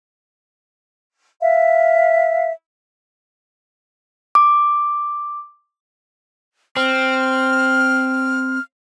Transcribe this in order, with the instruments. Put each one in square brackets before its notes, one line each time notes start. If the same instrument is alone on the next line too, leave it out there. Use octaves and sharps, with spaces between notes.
[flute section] E5 F5
[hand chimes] D6
[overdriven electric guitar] C4 [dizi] F6